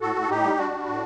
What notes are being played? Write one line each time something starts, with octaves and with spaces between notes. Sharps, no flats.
A2 F#4 A4
A2
A4
A2 D#4 G4
G3
G3 D4 F#4
G3
A2